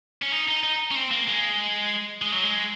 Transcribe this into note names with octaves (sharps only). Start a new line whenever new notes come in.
C#4
D#4
D#4
D#4
C#4
C4
A#3
G#3
G#3
F#3
G#3